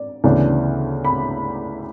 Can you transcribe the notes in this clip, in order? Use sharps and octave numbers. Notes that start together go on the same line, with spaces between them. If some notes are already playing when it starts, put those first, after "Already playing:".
Already playing: D5
D2 C#3 E3 B3 D4
B5